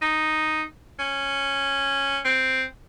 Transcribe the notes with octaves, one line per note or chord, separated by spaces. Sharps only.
D#4
C#4
C4